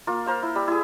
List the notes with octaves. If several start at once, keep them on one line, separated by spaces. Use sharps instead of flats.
A#3 F4
A#4 C5 F5
E4
G3 B5 E6
E4 G#4